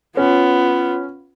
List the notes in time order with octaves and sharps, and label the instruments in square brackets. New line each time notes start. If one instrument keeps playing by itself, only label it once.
[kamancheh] B3 [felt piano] C#4 [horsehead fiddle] F4